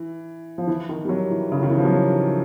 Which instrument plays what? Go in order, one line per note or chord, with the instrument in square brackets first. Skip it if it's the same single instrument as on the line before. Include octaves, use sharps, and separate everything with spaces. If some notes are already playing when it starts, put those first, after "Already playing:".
Already playing: [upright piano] E3
F3
E3
D#3
G3
F#3
E3
C#3
D#3
E3
F3
F#3
G3